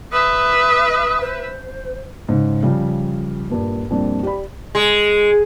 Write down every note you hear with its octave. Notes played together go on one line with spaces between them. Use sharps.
B4 E5 D#6
C5
G#2 C#3
C#3 F3 G3
G2 A#2
F2 A#2 G3 D4
G4 D5 B5
G#3